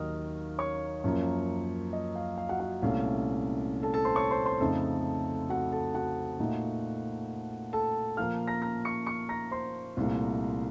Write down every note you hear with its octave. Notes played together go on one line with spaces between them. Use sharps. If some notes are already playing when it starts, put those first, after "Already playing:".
Already playing: D#2 D#3 F#3 D#5 D#6 F6
C#5 C#6
F#2 F3 A#3
D#5
F5
F5
F#4 F#5
F#4 F#5
C2 A#2 A3 C#4 F5
A4 A5
A4 A5
C5 C6
C#5 C#6
C5 C6
C5 C6
F2 C#3 A3 D#4 A4 A5
F#4 F#5
A4 A5
F#4 F#5
A#2 A3 D#4
A4 A5
A#2 F3 A#3 F5 F6
A#5 A#6
A#5 A#6
C#6 C#7
C#6 C#7
A#5 A#6
C5 C6
C2 A#2 A3